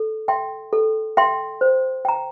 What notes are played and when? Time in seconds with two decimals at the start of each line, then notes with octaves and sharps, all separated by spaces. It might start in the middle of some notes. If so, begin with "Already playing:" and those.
Already playing: A4
0.28 E5 G5 C6
0.73 A4
1.17 E5 G5 C6
1.61 C5
2.05 G5 A#5